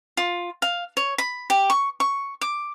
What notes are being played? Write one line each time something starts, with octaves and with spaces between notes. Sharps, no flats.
F4
F5
C#5
B5
G4
C#6
C#6
D6